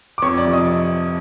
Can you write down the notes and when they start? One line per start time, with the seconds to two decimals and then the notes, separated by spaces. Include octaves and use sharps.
0.18 D6
0.22 F2 C#5 C#6
0.37 D5 D6
0.45 C3 F3
0.53 D#5 D#6